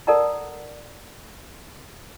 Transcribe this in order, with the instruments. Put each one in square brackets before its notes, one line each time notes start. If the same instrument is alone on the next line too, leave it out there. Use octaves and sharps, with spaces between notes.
[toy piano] A4 A#4 D5 F#5 A5 A#5